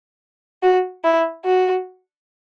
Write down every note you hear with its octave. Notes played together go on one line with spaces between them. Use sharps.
F#4
E4
F#4